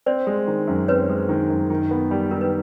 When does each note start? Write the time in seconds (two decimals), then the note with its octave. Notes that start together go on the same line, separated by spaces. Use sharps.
0.06 C4 C5 D5
0.27 G#3
0.47 D#3
0.67 F#2
0.88 C4 B4 C#5
1.09 G#3
1.29 D#3
1.50 F#2
1.70 D#3
1.91 B3
2.11 G3
2.31 D#3 A#4
2.41 B4